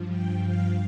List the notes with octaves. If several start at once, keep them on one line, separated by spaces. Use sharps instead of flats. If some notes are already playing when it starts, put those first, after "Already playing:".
Already playing: G2 F3
G5
F5